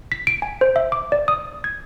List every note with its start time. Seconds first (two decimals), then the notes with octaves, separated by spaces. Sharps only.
0.12 B6
0.27 D7
0.42 G#5
0.61 C5
0.76 E5
0.92 D6
1.12 D5
1.28 D#6
1.64 G#6